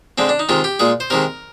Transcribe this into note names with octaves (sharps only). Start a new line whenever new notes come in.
D3 G#3 C4
D4
D#4
C3 D#3 G#3 F4
G4
A#2 G#3 G#4
C5
C3 D#3 G#3 A#4